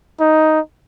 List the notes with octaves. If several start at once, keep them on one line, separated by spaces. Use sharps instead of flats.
D#4